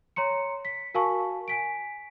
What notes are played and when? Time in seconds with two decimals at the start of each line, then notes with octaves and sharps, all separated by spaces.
0.16 C#5 A#5 C6 C#7
0.65 B6
0.94 F#4 A#4 F5 G#5 A5 C#6
1.48 G#5 B6 D7